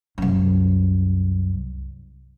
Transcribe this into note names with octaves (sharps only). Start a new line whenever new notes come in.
C2 F#2